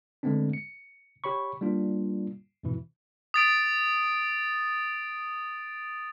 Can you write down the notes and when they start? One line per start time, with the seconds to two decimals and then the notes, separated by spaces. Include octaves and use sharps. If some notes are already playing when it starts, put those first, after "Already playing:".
0.23 D3 G#3 A3 B3 C4 D4
0.53 C#7
1.24 G4 C#5 B5 C#6
1.61 G3 A#3 D4 F4
2.63 F2 G#2 B2 E3 E4
3.34 D#6 A6 D7